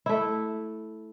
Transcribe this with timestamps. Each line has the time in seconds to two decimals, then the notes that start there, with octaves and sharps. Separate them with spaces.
0.06 A3 E4